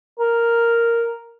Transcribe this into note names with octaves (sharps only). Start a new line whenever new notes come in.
A#4